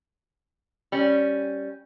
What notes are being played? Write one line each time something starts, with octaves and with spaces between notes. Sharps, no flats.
G3 C#4